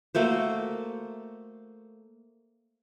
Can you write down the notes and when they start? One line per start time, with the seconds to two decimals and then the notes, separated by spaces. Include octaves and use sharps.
0.15 A3 A#3 F#4 C5